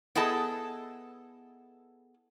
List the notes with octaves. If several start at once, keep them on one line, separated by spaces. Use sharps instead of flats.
B3 E4 G#4 A4 D#5 A5